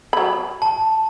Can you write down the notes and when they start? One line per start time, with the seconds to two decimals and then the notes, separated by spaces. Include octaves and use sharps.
0.13 F#3 B5
0.62 A5